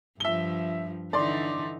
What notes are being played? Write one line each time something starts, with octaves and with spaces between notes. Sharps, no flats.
G2 F3 E5 G7
D3 E3 D#4 D5 C6